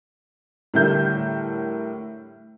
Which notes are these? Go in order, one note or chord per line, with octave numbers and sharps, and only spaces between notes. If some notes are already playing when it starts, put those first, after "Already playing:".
A2 D3 G3 A#4 E5 G6